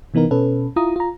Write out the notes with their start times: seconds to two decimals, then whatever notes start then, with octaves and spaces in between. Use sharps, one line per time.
0.14 C3 E3 B3 D#4 A#4
0.31 B2 C#4 A4 B4
0.76 E4 F4 A#5 D#6
0.96 F4 A#5